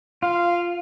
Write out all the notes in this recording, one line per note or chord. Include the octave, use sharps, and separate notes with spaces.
F4 F5